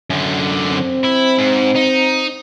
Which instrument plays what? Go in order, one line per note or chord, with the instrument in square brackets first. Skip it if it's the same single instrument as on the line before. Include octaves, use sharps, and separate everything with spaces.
[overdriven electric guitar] F#2 D3
[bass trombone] C4
[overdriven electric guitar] E4
G#2
D#4